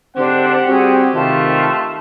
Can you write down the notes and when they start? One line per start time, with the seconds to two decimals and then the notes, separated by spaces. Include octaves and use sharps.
0.16 G#2 D3 C4 D4 G4 C5 F#5
0.68 G3 C4 F#4 G#4
1.14 C3 D#3 A3 F4 A5